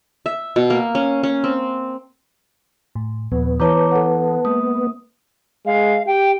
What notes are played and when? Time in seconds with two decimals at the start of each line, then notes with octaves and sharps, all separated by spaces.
0.26 E5
0.56 B2
0.70 A#3
0.95 C#4
1.23 C#4
1.44 C4
2.95 A2
3.32 D#2 A#2 F3 B3
3.60 E3 E4 B4 C#5 A5 A#5 D6
3.92 A4 F#5
4.45 G#3 A#3 D#6
5.66 G#3 F5
6.07 G4 G5